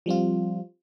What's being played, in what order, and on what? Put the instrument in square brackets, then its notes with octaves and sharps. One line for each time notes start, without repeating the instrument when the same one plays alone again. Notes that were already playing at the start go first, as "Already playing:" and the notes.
[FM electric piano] F3 G3 C4 F4